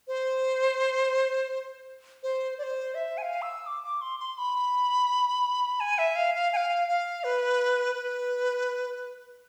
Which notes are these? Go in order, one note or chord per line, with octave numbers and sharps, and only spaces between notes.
C5
C5
D5
C5
E5
G#5
F5
E6
D6
D6
C6
C6
B5
G#5
E5
F5
F5
G#5
F5
F5
B4
B4